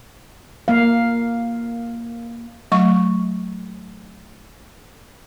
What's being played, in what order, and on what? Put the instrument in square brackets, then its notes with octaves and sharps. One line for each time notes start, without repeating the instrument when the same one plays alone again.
[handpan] A#3 F5
[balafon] F#3 A3 C#6